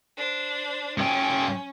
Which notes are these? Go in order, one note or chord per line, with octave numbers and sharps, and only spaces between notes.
D4 C5
F#2 C#4 G5